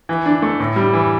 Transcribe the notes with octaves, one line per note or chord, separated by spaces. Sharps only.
E3
D4
A3
A2
G3
E3